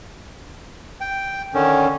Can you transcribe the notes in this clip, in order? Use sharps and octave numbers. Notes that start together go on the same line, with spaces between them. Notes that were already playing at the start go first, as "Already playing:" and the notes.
G5
D3 D#3 C#4